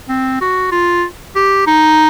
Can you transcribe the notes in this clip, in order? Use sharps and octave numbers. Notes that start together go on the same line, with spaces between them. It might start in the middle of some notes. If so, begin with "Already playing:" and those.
C4
F#4
F4
G4
D#4